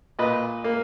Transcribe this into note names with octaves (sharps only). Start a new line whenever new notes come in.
A#2 B4 D#5
A#3